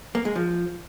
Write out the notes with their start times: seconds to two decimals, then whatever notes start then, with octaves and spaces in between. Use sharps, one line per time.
0.15 A#3
0.25 G#3
0.35 F3